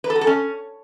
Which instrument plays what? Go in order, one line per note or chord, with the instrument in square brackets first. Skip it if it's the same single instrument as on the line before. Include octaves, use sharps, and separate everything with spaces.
[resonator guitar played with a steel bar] B4
A4
F#4
A4
C#4